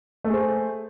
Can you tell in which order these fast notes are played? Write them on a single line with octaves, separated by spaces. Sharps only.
A3 G#4 C5